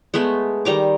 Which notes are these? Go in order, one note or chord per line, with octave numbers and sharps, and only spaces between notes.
G#3 A3 B3 E5
D#3 G3 A#5 D6